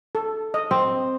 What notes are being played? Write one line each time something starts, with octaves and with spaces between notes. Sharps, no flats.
A4
D#5
C4